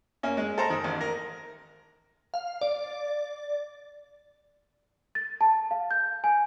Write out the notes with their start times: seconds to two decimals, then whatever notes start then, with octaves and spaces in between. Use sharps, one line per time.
0.23 A#3 C#4
0.37 G#3
0.58 A4 C5 A#5
0.70 D#3
0.84 A1
1.01 A#4
2.34 F5
2.61 D5
5.15 A6
5.41 A5
5.71 F5
5.91 G6
6.24 G#5